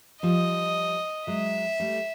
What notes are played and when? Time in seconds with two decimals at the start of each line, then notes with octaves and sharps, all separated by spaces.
0.23 F3 G3 D#5
1.27 F#3 G#3 E5
1.80 G3 A3